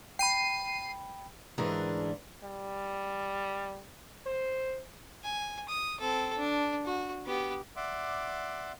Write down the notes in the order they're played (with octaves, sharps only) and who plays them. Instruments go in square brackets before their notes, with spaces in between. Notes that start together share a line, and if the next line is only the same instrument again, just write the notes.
[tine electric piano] G5 B5 [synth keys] C7 D#7
[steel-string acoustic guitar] D2 G#2 E3 D4 G#4 A#4
[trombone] G3
C5
[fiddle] G#5
D#6
C4 A4
D4
F#4
B3 G4
[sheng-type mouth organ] D5 E5 F#5 C6 D6